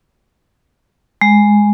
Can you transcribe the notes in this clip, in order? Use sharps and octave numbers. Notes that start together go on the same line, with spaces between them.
G#3